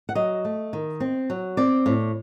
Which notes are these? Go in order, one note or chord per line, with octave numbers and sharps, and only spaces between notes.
F#5
F#3 D#5
A3
D#3
C4
F#3
C4 D5
A2